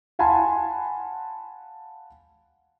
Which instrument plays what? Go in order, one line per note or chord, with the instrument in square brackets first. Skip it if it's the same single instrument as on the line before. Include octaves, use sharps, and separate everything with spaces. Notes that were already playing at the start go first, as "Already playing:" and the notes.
[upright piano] F5 F#5 G#5 A5 B5 C6